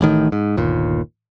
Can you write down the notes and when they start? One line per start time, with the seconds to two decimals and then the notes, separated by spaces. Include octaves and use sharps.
0.01 A1 A2 D#3
0.32 G#2
0.57 G1 D#2 A#2